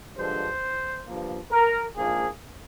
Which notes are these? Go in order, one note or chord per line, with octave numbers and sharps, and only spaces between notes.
G2 D3 F3 G#3 C5
G2 F3 A#3
A#4
A#1 G#2 F3 A#3 G#4